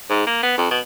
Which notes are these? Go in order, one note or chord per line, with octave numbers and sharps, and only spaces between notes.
G#2
A#3
B3
F2
B2